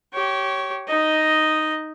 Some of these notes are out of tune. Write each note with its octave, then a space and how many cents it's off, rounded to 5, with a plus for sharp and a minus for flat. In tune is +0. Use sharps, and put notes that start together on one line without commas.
G4 -25 C#5 +0
D#4 +0 D#5 +0